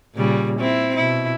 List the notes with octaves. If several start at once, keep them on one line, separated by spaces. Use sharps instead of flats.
A#2 C#3 G3
C4 E4
B2 E4